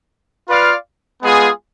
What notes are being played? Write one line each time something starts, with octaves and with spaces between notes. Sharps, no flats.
F4 B4 D5 F5
G#3 B3 F4 G#4